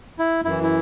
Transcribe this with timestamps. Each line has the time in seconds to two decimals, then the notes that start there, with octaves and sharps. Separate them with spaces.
0.19 E4
0.45 F#2 E3 E4
0.63 E4